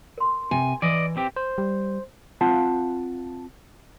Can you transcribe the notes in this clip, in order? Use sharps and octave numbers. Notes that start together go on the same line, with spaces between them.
A#4 C6
C3 G#5
E3 D5 D#5
C4 G4
C5
G3
C4 F4 F5 F#5 A5